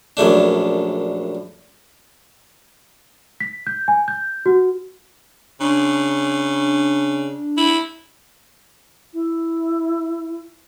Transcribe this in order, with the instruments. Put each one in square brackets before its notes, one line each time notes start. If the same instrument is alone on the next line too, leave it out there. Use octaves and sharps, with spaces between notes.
[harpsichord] A#1 F#2 A3 D4
[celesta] B6
G6
G#5
G6
F#4
[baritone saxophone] C#3 [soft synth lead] D4
[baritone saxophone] E4
[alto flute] E4